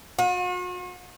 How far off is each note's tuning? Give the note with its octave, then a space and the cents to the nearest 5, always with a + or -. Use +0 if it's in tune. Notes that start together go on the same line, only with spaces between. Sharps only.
F#4 -45